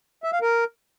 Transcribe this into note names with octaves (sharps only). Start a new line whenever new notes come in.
E5
F5
A#4